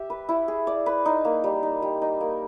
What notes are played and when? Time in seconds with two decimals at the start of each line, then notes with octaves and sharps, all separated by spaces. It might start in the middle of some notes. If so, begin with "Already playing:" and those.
Already playing: G4 E5
0.10 B4
0.29 E4
0.48 G#4
0.67 D5
0.86 B4
1.06 D#4
1.25 A#3
1.44 G3
1.63 D#4
1.82 G3
2.02 D#4
2.21 A#3